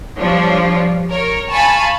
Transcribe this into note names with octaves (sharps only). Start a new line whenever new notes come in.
F3 G3 D4 C#5
A#4 C#5
F5 G#5 A5 B5 C#6